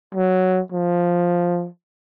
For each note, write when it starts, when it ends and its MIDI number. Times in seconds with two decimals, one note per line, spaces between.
0.15 0.61 54
0.72 1.68 53